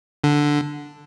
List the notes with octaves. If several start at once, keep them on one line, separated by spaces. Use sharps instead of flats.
D3